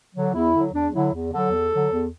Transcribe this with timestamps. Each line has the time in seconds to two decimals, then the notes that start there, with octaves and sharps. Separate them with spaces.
0.14 D3 F#3
0.33 E2 E4
0.53 D3 F#3
0.73 E2 D4
0.93 D3 F#3 E4
1.13 E2
1.32 D3 F#3 A4
1.52 E2
1.72 D3 F#3
1.91 E2